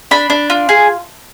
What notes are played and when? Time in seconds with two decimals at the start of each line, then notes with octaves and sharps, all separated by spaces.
0.11 D4 B5
0.30 D4
0.50 F4
0.69 G#4